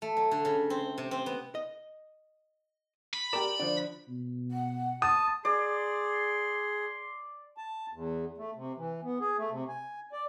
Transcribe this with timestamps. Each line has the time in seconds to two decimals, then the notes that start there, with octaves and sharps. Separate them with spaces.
0.02 A3
0.17 F#3
0.31 D3
0.45 C#3
0.70 C4
0.98 C3
1.11 C4
1.26 B3
1.55 D#5
3.14 B5
3.33 G4 A#4 D5 A5 A#5
3.60 D3 F3 D5
4.08 B2
4.51 F#5
5.02 A5 D#6
5.45 G#4 D5 C6
7.58 A5
7.93 E2
8.38 A3
8.56 C3
8.77 E3
9.03 B3
9.21 G#4
9.38 A3
9.50 C3
9.68 G#5
10.13 D5